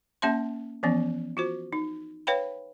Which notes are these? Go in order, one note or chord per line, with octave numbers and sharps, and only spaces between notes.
A#3 C#4 E5 A5 C6
E3 F3 B3 C#4
F4 F#4 C5
D#4
B4 C#5 F5 G5 B5